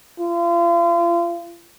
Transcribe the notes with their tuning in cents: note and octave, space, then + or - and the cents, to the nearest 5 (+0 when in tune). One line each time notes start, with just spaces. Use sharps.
F4 -35